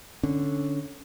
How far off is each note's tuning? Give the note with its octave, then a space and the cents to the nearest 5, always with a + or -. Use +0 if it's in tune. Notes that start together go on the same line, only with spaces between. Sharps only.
D3 +0 C#4 +0